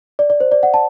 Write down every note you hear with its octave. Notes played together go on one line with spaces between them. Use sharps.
D5
D5
C5
D5
F#5
A5